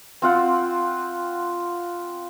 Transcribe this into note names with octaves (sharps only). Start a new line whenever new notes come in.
C4 F4 F#5